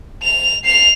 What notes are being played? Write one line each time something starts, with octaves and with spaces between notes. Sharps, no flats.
F7
C7 F7